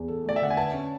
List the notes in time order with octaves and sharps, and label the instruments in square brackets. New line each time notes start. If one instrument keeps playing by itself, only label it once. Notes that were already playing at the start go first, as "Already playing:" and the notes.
Already playing: [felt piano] E2
A4
[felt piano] A3 [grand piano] D5
[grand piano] E5
[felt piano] D3 [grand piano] F#5
[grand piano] G#5
[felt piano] B4 [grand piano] A5
[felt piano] C#4